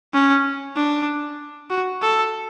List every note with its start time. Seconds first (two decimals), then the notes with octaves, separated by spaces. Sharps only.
0.13 C#4
0.76 D4
1.70 F#4
2.02 A4